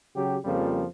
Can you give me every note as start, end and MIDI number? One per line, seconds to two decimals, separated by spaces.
0.15 0.37 49
0.15 0.37 54
0.15 0.37 67
0.45 0.84 41
0.45 0.84 49
0.45 0.84 53
0.45 0.84 55
0.45 0.84 58